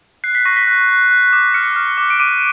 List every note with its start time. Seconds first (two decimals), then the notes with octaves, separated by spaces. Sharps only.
0.24 F#6 C7
0.35 B6
0.45 C#6 A#6
0.57 B6
0.67 F#6
0.89 F#6
1.11 F#6
1.33 D6
1.54 F6 C#7
1.76 F6
1.98 D6
2.10 D7
2.20 D6 D#7